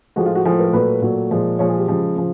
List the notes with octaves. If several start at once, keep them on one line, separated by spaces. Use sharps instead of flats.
A2 F3 G#3 F#4
F4
F#4
A2 F3 G#3 G#4
A#4
A#2 F#3 A3 B4
A#2 F#3 A3
A#2 F3 G#3
A#2 F3 G#3 C#5
G#4
G4
C#3 F3 G#3
C#3 F3